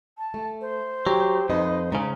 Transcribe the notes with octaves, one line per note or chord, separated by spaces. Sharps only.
A5
A3
C5
F#3 G4
F2 D#4 B4 D#5
G#2 C#3 C#4 A#5